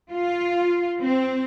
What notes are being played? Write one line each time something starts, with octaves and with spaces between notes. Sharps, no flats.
F4
C4